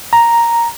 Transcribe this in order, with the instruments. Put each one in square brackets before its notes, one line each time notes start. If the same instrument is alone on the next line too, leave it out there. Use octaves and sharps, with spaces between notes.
[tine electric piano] A#5